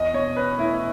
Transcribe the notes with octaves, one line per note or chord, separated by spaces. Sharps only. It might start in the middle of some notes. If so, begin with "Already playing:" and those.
Already playing: E2 D#5
B2 C#5
C#4 B4
A3 E4